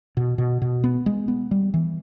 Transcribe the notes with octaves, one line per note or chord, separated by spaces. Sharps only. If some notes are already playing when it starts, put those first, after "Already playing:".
B2
B2
B2
B3
G#3
B3
G3
E3